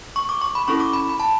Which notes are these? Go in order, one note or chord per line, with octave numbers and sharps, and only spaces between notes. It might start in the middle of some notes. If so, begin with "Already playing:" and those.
C#6
D6
C#6
B5
C#4 E4 A4 C#6
D6
B5
B5
A5